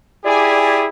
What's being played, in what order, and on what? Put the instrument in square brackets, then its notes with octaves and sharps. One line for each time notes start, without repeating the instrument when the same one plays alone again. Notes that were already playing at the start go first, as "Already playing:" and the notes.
[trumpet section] E4 G4 G#4 [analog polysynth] D5 G#5